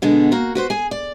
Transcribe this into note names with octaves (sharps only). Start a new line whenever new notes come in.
B2 D3 G#3 B3
A#3 F#4
F#4 B4 C5
G#4 G#5
D5